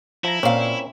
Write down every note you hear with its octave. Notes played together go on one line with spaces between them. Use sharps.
F3 E4 A#5
A#2 A#3 C4 C#4 F5